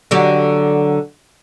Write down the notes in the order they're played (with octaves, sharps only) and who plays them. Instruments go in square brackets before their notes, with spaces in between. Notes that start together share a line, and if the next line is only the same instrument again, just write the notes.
[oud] D3 F#3 G4